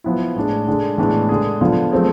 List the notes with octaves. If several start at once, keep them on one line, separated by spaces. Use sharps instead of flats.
F3 B3 E4
A2 G#3 D4
D3 G#3 D4
A2 E3 G#3 B3 D4
D3 G#3 D4 G#4
D3 F3 B3 F4
F3 A3 C4 G#4